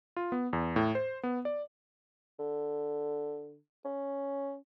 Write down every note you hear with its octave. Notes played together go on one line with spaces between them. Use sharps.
F4
B3
E2
A2
C5
B3
D5
D3
C#4